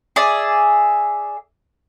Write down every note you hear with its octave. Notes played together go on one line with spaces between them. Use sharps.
G#4 D5 E5